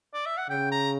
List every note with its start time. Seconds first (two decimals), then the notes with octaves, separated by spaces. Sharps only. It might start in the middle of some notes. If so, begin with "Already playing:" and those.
0.14 D5
0.26 E5
0.38 F#5
0.49 C#3 G5
0.72 A#5